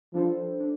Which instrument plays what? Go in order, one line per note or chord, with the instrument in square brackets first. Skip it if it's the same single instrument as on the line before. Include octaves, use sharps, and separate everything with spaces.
[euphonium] F3 [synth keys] G3 D4 A4 C5
[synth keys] D4